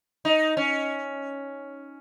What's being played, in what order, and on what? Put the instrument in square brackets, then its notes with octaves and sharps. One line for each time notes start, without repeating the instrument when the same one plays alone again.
[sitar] D#4
C#4